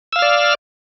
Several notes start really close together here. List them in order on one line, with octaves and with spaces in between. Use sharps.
E6 F5 F6 D5